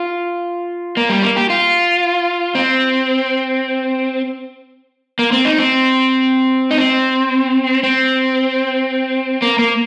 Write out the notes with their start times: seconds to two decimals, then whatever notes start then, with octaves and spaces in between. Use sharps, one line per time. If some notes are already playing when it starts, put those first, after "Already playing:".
Already playing: F4
0.97 A#3
1.09 G3
1.23 A#3
1.36 G4
1.50 F4
2.55 C4
5.19 A#3
5.32 C4
5.45 D#4
5.59 C4
6.71 D#4
6.78 C4
7.83 C4
9.42 A#3
9.59 A#3